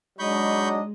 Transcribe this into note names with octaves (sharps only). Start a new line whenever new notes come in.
F#3 G#3 D4 D#4 D#5 B5 C#6 G6